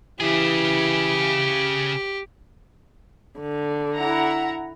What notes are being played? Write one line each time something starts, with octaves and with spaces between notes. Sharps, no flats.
C#3 E3 E4 G4 G#4
D3
E4 F#5 A#5